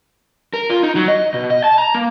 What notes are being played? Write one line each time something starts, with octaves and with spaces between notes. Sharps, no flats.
A#4
F4
D#4
F#3
D#5
B2
D#5
A5
A#5
A#3